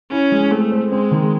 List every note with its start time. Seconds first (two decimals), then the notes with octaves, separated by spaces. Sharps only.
0.12 C#4 E4
0.32 G#3
0.51 A3 C4
0.72 C5
0.91 G#3 C4
1.11 D#3